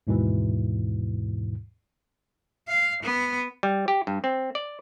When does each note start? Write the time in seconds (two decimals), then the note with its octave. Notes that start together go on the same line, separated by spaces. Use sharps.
0.07 D#2 G#2 B2 E3
2.68 F5
3.03 B3
3.63 G3
3.88 G4
4.07 G2
4.24 C4
4.55 D5